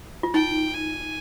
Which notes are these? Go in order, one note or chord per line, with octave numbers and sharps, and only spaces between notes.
F4
D#4 G5
G#5